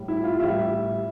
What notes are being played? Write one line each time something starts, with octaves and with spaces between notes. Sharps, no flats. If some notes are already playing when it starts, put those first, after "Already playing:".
Already playing: A2 G3
E4
F4
A2 G3 E5